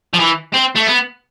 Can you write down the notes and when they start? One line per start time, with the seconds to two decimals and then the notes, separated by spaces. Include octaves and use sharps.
0.14 F3
0.20 E3
0.54 C4
0.76 A3
0.87 B3